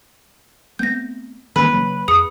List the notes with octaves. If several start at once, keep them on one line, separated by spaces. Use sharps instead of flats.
A3 B3 C4 G6 A#6
D#3 E3 A#3 B4
C#3 F#3 A#3
F2 G#4 D#6 C#7